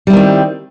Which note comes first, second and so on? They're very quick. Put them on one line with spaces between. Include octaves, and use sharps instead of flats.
G3 E4 D#3 C4